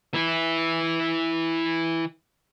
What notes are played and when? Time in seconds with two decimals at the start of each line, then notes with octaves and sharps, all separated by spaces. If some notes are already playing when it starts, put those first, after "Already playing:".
0.14 E3 E4